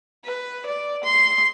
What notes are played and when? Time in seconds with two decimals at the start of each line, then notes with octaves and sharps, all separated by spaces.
0.25 B4
0.66 D5
1.04 C6